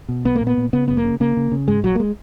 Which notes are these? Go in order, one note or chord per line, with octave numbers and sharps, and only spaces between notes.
B2
B1 B3
A#3
A#2
B3
A#2
C#3 B3
F#1 B3
A#3
C#3
C#3 A#3
C#3
C#3
G#2 G#3
A#1 F#3
A#3
G#3